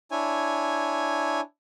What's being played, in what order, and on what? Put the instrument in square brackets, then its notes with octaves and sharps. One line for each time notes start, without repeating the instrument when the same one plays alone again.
[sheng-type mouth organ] D4 E4 C#5 G#5